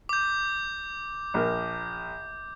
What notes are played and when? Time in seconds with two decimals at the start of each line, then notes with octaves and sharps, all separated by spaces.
0.09 D6 G6
1.34 A#1 A#4